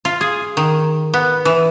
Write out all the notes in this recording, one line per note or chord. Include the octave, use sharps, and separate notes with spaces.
F4
G#4
D#3
B3
E3